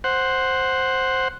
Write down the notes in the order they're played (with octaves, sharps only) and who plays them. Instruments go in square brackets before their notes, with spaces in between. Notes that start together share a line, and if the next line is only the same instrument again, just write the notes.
[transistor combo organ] C5 F#5